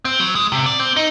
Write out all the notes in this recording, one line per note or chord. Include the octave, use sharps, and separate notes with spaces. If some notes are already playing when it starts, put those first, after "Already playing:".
C4
F#3
G#3
C3
D5
C4
D#4